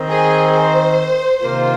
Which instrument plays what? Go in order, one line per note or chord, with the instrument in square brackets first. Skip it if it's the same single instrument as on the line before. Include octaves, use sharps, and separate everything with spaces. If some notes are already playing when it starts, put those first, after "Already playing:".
Already playing: [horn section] D#3 C4 D#4
[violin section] G#4
C5
[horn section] C3 D#3 A#3 F4 [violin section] C5